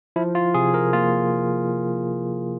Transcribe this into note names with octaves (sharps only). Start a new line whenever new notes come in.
F3 E4
F4
C3 G#4
A#4
A#3 F4